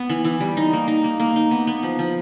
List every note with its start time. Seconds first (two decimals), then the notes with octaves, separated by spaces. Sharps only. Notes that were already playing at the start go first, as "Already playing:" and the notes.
Already playing: B3
0.10 E3
0.25 E3
0.40 G3
0.57 D#4
0.73 A#3
0.88 D#4
1.04 A#3
1.20 A#3
1.36 D#4
1.51 B3
1.67 B3
1.83 F3
1.99 F3